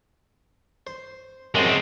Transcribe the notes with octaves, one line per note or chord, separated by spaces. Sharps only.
C5
F#2 C3 G#3 C4 A5